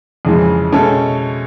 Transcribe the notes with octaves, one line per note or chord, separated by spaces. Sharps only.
F2 C#3 E3 G#3
B2 G#3 C#4 E4 A4